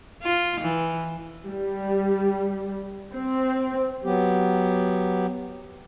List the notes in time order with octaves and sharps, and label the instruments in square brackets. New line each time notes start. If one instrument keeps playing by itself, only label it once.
[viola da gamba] F4
E3
[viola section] G3
C4
[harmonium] F#3 B3 G4